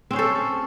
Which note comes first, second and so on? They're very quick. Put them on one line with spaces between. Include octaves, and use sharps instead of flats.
C4 C#4 C5 A4